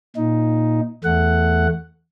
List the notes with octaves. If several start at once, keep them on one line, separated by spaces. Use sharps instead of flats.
A#2 D#4
E2 A3 F#5